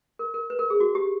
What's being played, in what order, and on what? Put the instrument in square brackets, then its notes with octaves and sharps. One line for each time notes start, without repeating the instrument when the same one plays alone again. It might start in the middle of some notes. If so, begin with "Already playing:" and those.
[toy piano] A#4
A#4
B4
A#4
G#4
F#4
G4